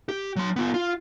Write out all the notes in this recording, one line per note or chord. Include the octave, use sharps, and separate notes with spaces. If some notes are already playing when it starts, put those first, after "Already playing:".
G4
F#3 C6
B3 F4
F4